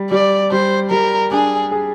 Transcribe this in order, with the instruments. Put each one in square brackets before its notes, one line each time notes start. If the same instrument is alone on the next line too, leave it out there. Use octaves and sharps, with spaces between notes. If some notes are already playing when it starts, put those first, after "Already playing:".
Already playing: [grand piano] G3
[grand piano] G3 [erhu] D5
[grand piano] G3 [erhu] C5
[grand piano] G3 [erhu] A#4
[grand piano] D4 [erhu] G#4
[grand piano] G#4